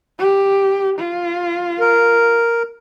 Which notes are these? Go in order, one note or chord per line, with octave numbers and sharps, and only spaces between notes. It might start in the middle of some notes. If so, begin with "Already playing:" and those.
G4
F4
A#4